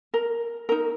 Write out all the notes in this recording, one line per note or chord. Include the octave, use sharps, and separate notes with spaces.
A#4
D#4 A#4